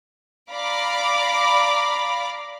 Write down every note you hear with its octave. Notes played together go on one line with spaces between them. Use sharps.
D5 F5 A#5 B5 D6